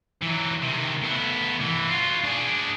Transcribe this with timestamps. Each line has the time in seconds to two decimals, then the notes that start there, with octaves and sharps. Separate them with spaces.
0.22 E3 F#3
0.63 C3 D#3
1.02 A2 B3
1.59 C2 E3
1.89 F4 F#4
2.24 D4 G#4